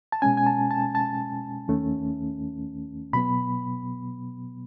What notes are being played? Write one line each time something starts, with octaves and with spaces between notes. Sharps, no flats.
A5
B2 G#3 C#4 G#5
G#5
A5
A5
A5
D#2 D#3 A3 C#4
B2 F#3 B3 B5